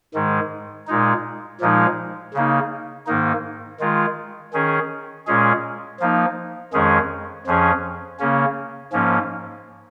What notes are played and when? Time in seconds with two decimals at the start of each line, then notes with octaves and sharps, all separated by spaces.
0.14 G#2 D#3 G#3
0.87 A#2 G#3 D#4
1.60 A#2 F3 G#3 D#4
2.34 C#3 A#3 D#4
3.07 G#2 D#3 A#3 D#4
3.80 D#3 G#3 F4
4.54 D#3 C#4 G#4
5.27 A#2 G#3 C#4 G#4
6.00 F3 A#3 D#4
6.73 F2 D#3 G#3 C#4 G#4
7.46 F2 F3 C#4 G#4
8.20 C#3 A#3 C#4
8.93 G#2 F3 A#3 C#4